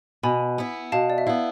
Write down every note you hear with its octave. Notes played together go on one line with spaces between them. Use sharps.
B2 G#5 B5
B3 E4
B2 F5 A5
D5
E5
B3 E4 F5